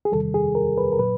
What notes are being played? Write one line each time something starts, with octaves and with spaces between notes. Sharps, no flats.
G#4
E2 C3 D#3 G3 A4
G#4
A#4
B4
A#4
A#2 F#3 B4